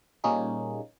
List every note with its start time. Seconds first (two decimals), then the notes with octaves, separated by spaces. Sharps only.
0.24 A#2 G3 A#3 C#4 D#4 G#4